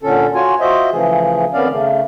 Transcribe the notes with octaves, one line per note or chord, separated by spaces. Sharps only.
A#2 D3 C#4 A4
F4 F#4 C#5 G#5
F4 F#4 C5 D#5 E5
C#3 E3 F3 A3 G#4
F2 D#3 B3 C#4 D5 F5
C#3 A3